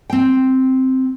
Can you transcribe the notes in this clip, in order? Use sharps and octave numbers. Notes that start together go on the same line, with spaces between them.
C4 G5